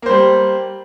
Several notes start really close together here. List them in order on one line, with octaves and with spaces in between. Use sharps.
A#3 C5 G3